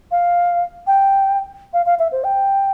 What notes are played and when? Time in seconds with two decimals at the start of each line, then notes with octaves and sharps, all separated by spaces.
0.11 F5
0.87 G5
1.73 F5
1.86 F5
1.99 E5
2.12 C5
2.24 G5